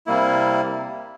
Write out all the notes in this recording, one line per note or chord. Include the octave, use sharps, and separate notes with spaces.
C3 G3 A#3 E4